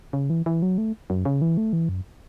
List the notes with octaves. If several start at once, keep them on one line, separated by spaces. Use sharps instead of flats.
C#3
E3
E3
F#3
A3
F#2
C#3
E3
A3
E3
F#2